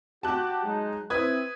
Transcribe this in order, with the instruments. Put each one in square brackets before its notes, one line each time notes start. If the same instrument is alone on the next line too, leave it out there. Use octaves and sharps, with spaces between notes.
[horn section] F#4 G4 [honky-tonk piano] A5 F#6
[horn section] F#3 G#3 D#4
[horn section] C4 E4 [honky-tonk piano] B4 D#6 G#6